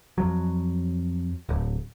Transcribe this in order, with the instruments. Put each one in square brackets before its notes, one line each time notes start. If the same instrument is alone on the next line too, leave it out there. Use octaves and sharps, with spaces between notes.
[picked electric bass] F2 F#3
D1